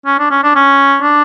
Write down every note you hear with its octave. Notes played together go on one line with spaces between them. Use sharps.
C#4
D4
C#4
D4
C#4
D4